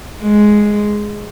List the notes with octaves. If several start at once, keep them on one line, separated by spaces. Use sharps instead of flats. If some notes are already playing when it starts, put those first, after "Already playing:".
G#3